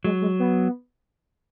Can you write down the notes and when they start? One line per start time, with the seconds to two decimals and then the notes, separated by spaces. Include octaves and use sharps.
0.04 F#3 G#3
0.21 G#3
0.39 B3